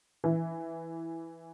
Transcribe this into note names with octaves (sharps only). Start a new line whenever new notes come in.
E3